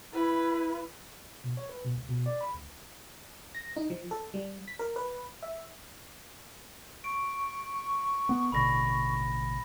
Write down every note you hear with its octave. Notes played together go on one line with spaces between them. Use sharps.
E4 B4
B2
C#5
B4
B2
C#2
B2
D5
B5
D2
A#6
D#4
F3
A4
G3
B6
A#4
B4
E5
C#6 D7
B3
A1 B2 D3 B5 A#6